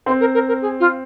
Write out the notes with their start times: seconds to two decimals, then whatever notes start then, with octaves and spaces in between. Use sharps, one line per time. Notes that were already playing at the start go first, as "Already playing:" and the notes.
0.06 C4 C5
0.20 A#4
0.34 A#4
0.48 A#4
0.62 G#4
0.80 F4